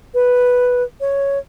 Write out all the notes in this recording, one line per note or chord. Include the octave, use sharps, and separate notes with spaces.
B4
C#5